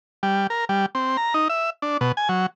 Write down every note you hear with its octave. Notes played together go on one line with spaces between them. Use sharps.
G3
A#4
G3
C4
A#5
D#4
E5
D4
B2
G#5
F#3